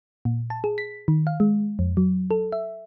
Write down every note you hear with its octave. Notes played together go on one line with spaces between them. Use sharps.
A#2
A5
G#4
B6
D#3
F5
G#3
F2
F#3
A4
E5